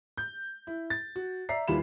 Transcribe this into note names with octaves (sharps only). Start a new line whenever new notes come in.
G6
E4
A6
F#4
D5 E5 A#5 C7
D#2 E3 G3 F4 B5 E7